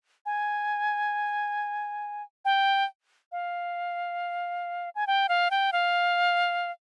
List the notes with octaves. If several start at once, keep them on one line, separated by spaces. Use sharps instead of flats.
G#5
G5
F5
G#5
G5
F5
G5
F5